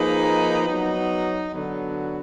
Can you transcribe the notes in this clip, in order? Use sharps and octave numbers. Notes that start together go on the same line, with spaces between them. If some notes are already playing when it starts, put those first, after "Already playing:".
Already playing: F3 A#3 D#4 G#4 B4
F#3 B3 D#4
D3 F#3 B3